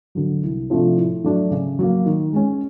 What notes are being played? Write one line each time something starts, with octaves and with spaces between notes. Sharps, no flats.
D3 F#3
C2
C3 F3 A3 D4
A2
F#3 A3 D4
C#3
F#3 A#3
D#3
G#3 C#4